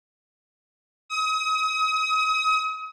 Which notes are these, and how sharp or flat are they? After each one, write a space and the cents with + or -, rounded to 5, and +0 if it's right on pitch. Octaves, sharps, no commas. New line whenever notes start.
D#6 +35